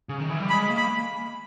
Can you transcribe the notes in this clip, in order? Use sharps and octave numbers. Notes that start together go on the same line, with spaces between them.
C#3
D#3
E3
G3
G#3 B5
A#3
B5